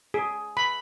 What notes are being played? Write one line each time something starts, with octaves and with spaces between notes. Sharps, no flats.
G#4
B5